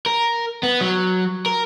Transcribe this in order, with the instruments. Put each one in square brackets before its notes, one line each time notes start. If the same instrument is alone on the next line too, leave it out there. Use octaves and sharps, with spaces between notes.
[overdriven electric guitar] A#4
B3
F#3
A#4